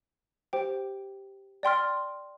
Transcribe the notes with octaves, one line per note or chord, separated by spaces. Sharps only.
G4 C5 G5
D5 G5 C6 F6